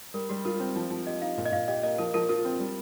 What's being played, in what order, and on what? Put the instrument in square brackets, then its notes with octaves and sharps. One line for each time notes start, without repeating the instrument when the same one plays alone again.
[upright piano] G3 [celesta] A#4
[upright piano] G3 [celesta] G4
[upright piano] F4 [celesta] A#4
[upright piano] C4
F3
F3
[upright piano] G4 [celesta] D#5
[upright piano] D#4 [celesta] F5
[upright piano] A#2
[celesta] D#5
[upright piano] A#2 [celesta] F5
[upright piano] G4 [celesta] D#5
[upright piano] A#3 [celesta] D#5
[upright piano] F3 [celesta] A#4
[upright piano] F3 [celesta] A#4
[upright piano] F4 [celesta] A#4
[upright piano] C4
G3